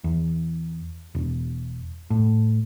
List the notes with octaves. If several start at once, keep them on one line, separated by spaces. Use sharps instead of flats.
E2
E1
A2